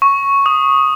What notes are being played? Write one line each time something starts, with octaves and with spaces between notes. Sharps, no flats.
C#6
D#6